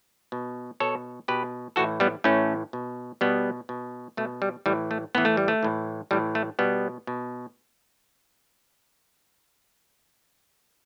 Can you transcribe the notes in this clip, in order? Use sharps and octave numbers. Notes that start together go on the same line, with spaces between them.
B2
B2 A4 C#5
B2 G4 B4
A2 E3 F#4 A4
G3 B3
A2 E3 A3 C#4
B2
B2 G3 B3
B2
B2 A3
G3
A2 E3 G3
A3
A2 E3 B3
A3
G3
A3
A2 E3
A2 E3 G3
A3
B2 G3 B3
B2